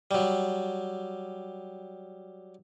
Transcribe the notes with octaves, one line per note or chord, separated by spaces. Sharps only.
F#3 G3